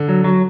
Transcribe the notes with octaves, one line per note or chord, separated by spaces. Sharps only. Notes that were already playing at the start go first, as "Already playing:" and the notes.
Already playing: D3
F#3
F#3